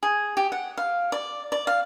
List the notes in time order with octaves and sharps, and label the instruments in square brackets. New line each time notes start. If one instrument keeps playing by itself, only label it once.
[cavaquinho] G#4
G4
F#5
F5
D5
D5
F5